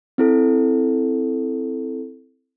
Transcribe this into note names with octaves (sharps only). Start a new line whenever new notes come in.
C4 E4 A4